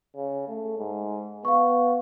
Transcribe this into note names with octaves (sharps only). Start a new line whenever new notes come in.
C#3
A3
G#2
B3 F5 C#6